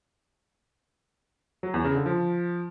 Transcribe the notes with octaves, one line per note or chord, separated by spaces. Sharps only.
F#3
E2
C#3
D3
F3